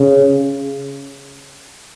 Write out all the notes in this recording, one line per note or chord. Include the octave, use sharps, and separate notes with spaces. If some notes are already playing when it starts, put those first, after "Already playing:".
Already playing: C#3